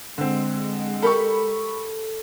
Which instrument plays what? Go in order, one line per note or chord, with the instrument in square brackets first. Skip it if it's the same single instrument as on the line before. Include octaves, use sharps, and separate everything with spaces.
[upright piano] D3 C4 [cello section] G#3
[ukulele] G4 A#4 [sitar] A4 [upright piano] B5 C#6